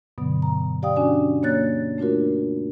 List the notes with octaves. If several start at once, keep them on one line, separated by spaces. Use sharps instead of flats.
G2 B2 D3 F#3 B3
A#5
G4 D5 F5 G5 D#6
C#4 D4 F#4 D5 G#5
A#3 C#5 F#6 A6
A3 D4 F4 F#4 A#4